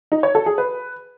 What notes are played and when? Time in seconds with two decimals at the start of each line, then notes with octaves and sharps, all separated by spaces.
0.12 D#4
0.23 C#5
0.35 A4
0.46 G#4
0.58 B4